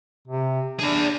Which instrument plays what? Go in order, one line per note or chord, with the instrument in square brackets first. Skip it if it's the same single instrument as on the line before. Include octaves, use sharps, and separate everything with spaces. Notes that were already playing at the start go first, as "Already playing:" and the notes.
[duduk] C3
[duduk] D4 [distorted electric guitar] G#4 D5